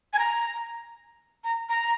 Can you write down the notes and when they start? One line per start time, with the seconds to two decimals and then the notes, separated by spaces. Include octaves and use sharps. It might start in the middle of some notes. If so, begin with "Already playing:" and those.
0.13 G#5
0.19 A#5
1.44 A#5
1.69 A#5